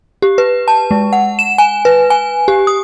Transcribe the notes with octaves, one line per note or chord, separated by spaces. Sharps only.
G4
B4
A5
G#3
F#5
E7
G#5
B4
G#5
G4
D#6